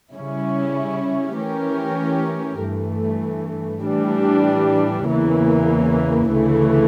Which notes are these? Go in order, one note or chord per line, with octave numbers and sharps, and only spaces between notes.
C#3 G3 C#4 E4
E3 A3 C#4 G4 A#4
G2 E3 A3
A2 E3 G3 D4
E2 C#3 E3 A#3
D2 C#3 E3 A3